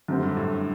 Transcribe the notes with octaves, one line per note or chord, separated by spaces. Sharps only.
F#2 D3 A3 C4 G4
G2
A2